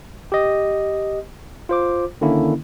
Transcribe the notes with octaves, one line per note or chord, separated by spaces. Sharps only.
G4 D#5
F4 C5 D6
D3 D#3 A#3 C#4 E4